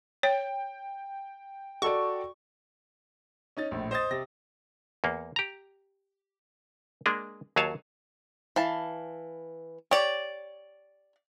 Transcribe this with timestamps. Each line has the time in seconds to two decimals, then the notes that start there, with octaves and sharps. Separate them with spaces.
0.23 C#5 G5
1.82 F#4 A4 D5 C#6
3.57 C#4 D#4 A6
3.71 A#1 A2
3.91 C5 D#5 D#6 A6
4.11 C3 A#6
5.04 E2 A#3
5.36 G4 A#5
7.06 G#3 A#3 D4 G#4
7.56 D#2 F#3 G#4 C#5 F5 A5
8.56 E3 F5 A5
9.91 G4 C#5 D5